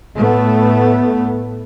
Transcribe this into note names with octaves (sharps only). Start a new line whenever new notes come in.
A2 A3 B3